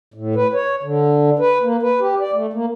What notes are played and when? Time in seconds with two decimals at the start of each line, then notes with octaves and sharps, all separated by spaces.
0.14 A2
0.35 B4
0.53 C#5
0.83 D3
1.39 B4
1.62 A#3
1.82 B4
2.00 G4
2.20 D5
2.33 A3
2.53 A#3